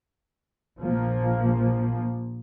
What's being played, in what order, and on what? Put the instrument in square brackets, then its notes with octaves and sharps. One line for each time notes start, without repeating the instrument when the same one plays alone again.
[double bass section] A#1 F3 A#3